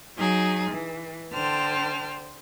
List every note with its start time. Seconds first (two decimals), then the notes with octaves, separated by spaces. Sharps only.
0.17 F#3 D#4 G#4
0.70 E3
1.32 D3 C5 G5 A5 F6